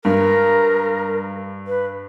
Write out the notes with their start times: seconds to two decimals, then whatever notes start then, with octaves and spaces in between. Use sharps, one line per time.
0.05 G2 A#4
1.67 B4